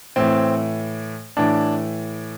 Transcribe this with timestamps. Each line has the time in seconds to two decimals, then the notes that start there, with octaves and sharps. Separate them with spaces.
0.16 A2 E3 C4
1.37 A2 E3 D4